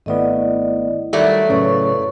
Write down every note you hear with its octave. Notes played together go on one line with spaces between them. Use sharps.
G#1 A3 B3 E4 D5 D#5
D#3 F#3 G3 A3 D5
F#2 A2 C#3 B4 C#5 C#6